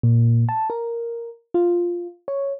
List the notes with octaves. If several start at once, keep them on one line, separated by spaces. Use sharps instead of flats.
A#2
A5
A#4
F4
C#5